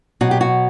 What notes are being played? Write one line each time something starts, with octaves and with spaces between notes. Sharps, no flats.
B2 F#3 F#4
G4
F#4